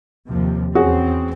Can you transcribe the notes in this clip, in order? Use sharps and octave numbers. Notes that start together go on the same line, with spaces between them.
D#2 C3 F3
E2 C4 C#4 F#4 G#4